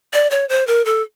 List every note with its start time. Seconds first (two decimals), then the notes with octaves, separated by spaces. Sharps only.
0.13 D5
0.31 C#5
0.49 C5
0.67 A#4
0.85 A4